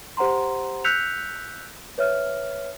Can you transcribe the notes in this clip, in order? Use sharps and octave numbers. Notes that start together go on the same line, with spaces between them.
G4 C5 F#5 A#5 C6
E6 F#6 G6 B6 C#7 F7
B4 C#5 E5 F6